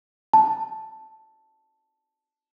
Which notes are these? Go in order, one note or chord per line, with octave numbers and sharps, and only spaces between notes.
A5